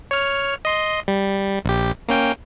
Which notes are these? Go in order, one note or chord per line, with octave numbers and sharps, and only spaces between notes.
C#5 F6
D#5 C6
G3
A#1 G4
A#3 C#4 G5